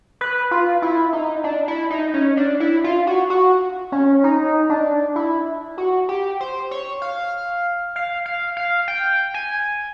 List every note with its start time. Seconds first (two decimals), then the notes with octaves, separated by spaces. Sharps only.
0.21 B4
0.51 F4
0.82 E4
1.13 D#4
1.44 D4
1.68 E4
1.90 D#4
2.14 C#4
2.37 D4
2.60 E4
2.84 F4
3.07 F#4
3.30 F#4
3.92 C#4
4.24 D#4
4.70 D4
5.16 E4
5.78 F#4
6.09 G4
6.40 C5
6.71 C#5
7.02 F5
7.96 F5
8.26 F5
8.57 F5
8.88 G5
9.34 G#5